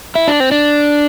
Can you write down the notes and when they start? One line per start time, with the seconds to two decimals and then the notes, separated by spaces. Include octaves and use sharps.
0.15 E4
0.28 D4
0.40 C4
0.51 D4